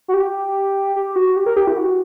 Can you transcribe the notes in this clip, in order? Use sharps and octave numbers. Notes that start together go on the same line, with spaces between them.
F#4
G4
G4
F#4
G4
A#4
G4
E4
G4
F#4